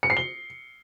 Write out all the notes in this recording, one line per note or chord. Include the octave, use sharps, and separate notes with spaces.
C#7
C7
G7